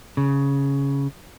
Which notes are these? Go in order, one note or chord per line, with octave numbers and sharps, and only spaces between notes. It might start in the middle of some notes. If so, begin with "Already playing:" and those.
C#3